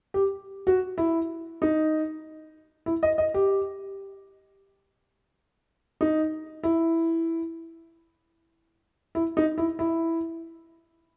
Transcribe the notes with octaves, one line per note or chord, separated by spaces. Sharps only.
G4
F#4
E4
D#4
E4
D#5
D#5
G4
D#4
E4
E4
D#4
E4
E4